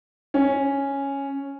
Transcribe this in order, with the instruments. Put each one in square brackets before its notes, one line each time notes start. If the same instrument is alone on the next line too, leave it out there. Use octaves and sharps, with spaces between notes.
[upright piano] C#4